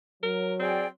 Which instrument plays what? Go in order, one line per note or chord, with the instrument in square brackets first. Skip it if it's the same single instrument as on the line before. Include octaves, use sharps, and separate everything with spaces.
[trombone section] F#3 [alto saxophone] A#4
[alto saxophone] C4 [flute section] G#4 D5 G5